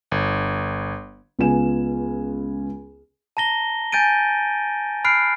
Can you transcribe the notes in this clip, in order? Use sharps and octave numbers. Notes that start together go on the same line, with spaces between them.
G1
C#2 B3 F4 G#5 E7
A5 A#5 A#6 G7
G#5 G6 A6 D7 D#7
B5 F6 F#6 C7 D7